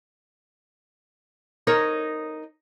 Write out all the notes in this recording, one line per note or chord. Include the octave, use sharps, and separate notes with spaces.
D#4 A#4 C#5